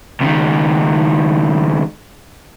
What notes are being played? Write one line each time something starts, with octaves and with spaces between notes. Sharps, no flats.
C#2 D#3